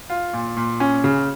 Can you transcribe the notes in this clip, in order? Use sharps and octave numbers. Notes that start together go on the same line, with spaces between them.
F4
A#2
A#2
C#4
C#3